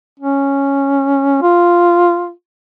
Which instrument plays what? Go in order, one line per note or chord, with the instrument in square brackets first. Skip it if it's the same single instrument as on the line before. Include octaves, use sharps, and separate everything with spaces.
[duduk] C#4
F4